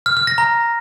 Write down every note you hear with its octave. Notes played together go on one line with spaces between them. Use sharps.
F6
F6
A#6
A#5